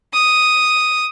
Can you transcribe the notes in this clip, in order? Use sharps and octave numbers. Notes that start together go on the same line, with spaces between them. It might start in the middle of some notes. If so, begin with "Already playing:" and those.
D#6